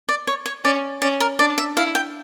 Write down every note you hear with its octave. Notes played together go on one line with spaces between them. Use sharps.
D5
C#5
C#5
C#4 D5
C#4 D5
A#4
D4 D5
E5
E4 F5
G5